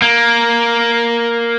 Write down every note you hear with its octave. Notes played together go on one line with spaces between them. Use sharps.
A#3